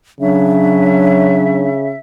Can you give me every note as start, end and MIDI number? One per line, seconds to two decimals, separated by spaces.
0.20 1.96 49
0.20 1.72 54
0.20 1.70 62
0.20 1.97 76